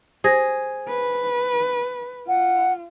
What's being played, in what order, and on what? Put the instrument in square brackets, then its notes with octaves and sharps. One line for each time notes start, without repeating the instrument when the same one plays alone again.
[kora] G#4 [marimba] C5 A#6
[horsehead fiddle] B4
[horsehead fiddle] F4 [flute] F#5